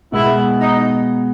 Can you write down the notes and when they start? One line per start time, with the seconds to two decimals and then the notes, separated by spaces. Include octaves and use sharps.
0.12 B2 G#3 B3 E4
0.60 D#4